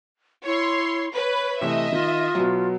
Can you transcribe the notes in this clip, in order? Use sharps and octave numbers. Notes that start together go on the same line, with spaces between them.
E4 C#5 C6
B4 C#5
C3 E3 A3 D#5 E5
D#3 F4
B2 F#3